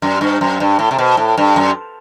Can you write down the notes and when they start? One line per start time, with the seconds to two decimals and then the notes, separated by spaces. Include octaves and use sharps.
0.02 F#2
0.21 G2
0.41 F#2
0.60 G2
0.79 A2
0.91 C3
0.98 B2
1.17 A2
1.38 G2
1.56 F#2